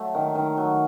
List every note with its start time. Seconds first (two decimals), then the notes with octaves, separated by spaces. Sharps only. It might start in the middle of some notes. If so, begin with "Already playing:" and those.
Already playing: F#3 A3
0.15 D#3
0.35 D#3
0.57 F#3